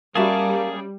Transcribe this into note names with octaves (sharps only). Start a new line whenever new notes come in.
G3 A#3 C#4 F#4 G#4 E5 A5